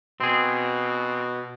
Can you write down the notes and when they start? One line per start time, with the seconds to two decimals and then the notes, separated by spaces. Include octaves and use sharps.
0.20 B2 C4 G#4